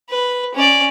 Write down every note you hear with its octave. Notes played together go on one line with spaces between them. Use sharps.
B4
C#4 D5